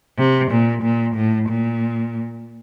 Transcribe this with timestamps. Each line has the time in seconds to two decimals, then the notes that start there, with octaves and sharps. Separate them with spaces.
0.18 C3
0.50 A#2
0.82 A#2
1.15 A2
1.49 A#2